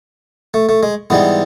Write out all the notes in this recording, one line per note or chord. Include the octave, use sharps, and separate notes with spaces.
A3
A3
G#3
G#2 E3 G3 B3